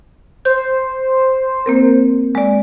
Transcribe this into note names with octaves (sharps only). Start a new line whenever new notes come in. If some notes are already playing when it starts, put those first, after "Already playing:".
C5 G6
A#3 C4 A#4
G#3 D5